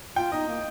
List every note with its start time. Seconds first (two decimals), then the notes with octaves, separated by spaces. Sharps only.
0.16 F4 G5
0.32 D#4 D#5
0.48 A#3